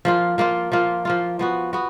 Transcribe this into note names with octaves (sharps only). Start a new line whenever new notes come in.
F3 A#3 F4
F3 A#3 F4
F3 A#3 F4
F3 A#3 F4
F3 B3 F#4
B3 F#4